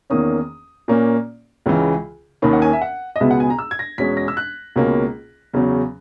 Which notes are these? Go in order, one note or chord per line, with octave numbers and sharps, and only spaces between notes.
E2 D#3 A#3 C#4 D#6
A#2 A#3 C#4
C#2 C#3 E3
D#2 D#3 A#3 C#4 B5
F#5
G#5
E5
F#5
D#5
C#2 B2 G#3 B3 E5
F#5
G#5
A#5
E6
G#6
A#6
E2 B2 G#3 C#4 B6
A#6
E6
F#6
C#2 B2 A#3 C#4
E2 C#3 F#3 C#4